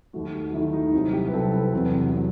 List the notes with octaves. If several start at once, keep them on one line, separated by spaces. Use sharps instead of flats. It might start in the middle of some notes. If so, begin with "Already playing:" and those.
D#2 D#3 A3 F#4
F#4
D#2 D#3 A3 E4
D#4
C2 C3 F#3 C4 E4
G4
B4
C2 C3 F#3 C4 A4
B4
E2 C3 F#3
C3 F#3